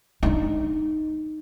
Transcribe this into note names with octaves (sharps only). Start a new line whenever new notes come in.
D4 D#4